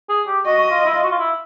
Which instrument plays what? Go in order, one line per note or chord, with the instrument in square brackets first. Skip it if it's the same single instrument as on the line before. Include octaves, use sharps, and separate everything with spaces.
[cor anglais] G#4
G4
[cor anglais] F#4 [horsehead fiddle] D#5
[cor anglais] F#4
F4
E4
F4
F#4
F4
E4